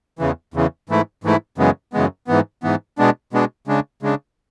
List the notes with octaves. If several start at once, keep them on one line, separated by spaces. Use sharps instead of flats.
E2 C#3 E3
E2 C#3 E3
G#2 E3 A3 E4
G#2 E3 A3 E4
F#2 C#3 E3 G#3 B3
F#2 C#3 E3 G#3 B3
G#2 E3 B3
G#2 E3 B3
B2 G#3 B3 D4
B2 G#3 B3 D4
C#3 G#3 D4
C#3 G#3 D4